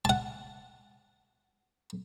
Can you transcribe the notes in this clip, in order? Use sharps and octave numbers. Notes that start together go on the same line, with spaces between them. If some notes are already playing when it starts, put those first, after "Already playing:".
F#5 A5